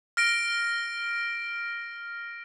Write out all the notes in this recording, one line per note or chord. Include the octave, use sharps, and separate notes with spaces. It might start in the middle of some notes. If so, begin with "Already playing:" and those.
F6 A#6 D7